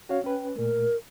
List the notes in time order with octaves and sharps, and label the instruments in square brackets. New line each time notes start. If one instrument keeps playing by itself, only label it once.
[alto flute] C#4 [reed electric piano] F#4 C#5 F5
[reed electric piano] C#4 B4 [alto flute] G5
[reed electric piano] A#2 A3 [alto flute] A#4